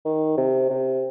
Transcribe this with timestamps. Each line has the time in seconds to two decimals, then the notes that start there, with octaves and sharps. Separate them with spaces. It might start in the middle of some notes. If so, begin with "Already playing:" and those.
0.05 D#3
0.37 C3
0.70 C3